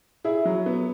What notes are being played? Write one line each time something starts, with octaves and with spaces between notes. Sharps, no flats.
E4 G#4
F#3
B3